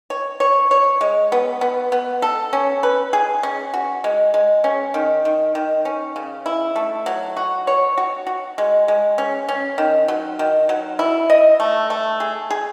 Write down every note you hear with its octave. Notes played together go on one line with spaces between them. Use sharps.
C#5
C#5
C#5
G#3
B3
B3
B3
A4
C#4
B4
G#4
C#4
F#4
G#3
G#3
C#4
D#3
D#3
D#3
C#4
C#3
E4
A3
F#3
F#4
C#5
F#4
F#4
G#3
G#3
C#4
C#4
D#3
F#3
D#3
F#3
E4
D#5
A3
A3
G#4
G#4